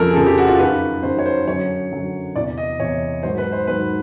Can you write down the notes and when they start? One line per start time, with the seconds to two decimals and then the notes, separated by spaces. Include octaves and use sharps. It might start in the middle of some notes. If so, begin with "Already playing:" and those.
Already playing: F2 C#3 F3 A4 A#4
0.10 G#4
0.15 F2 C#3 F3 A4
0.26 G4
0.38 F#4
0.48 F4
0.59 F#2 D#3 F#3 B4
1.03 F#2 D#3 F#3 C5
1.19 C#5
1.26 C5
1.47 F#2 D3 F#3 C#5
1.91 F#2 D3 F#3
2.35 E2 C3 E3 D5
2.58 D#5
2.80 E2 C3 E3 C#5
3.23 G#2 D#3 F#3 C5
3.38 B4
3.52 C5
3.67 G#2 D#3 F#3 B4